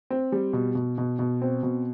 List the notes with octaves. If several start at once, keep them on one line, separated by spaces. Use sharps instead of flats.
C4
G3
B2
B2
B2
B2
C4
B2